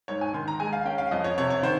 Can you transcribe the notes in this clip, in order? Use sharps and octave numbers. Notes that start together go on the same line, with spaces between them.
G#2 C#5
G#5
D#3 C6
A#5
G#3 G#5
F5
C#4 G5
F5
F2 D#5
C#5
C3 C#5
C#5
D#3 C5